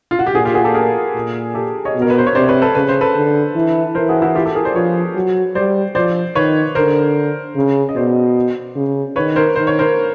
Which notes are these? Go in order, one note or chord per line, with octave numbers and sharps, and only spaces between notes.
F4
F#4
G4
A#2 F#4 G#4
F4 G4
F#4 G#4
G4 A4
G#4 A#4
A#2
G4 A4
C#5 D#5
B2
A#4
B4
C5
C#5
C3 C5 D5
B4 C#5
A4 B4
C#3 B4
C5
A4 B4
D3
E3
E3 A#4 C5
F#4 G#4
E4 F#4
F4 G4
G4 A4
G#4 A#4
C5 D5
F3 B4 C#5
F#3
G3 C5 D5
F3 C5 D5
D#3 B4 C#5
D3 A#4 C5
C#3
D#5
B2 C5 D5
C#3
D#3 B4 C#5
A#4 C5
D#3 C5
C#5
A#4 C5